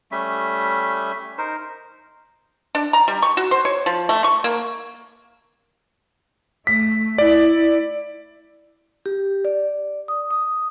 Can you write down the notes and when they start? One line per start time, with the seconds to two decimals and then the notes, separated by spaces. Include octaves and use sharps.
0.11 G3 A3 C#4 E5
1.38 D#4 A#4 C5
2.75 D4
2.93 A#5
3.08 G3
3.22 C#6
3.37 F#4
3.51 C5
3.65 C#5
3.86 F3
4.09 A3
4.24 C#6
4.44 A#3
6.67 A3 B6
7.18 E4 D5
9.06 G4
9.45 D5
10.08 D#6
10.31 D#6